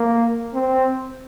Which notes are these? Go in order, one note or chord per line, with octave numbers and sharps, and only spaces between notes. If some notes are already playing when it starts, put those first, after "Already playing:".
Already playing: A#3
C4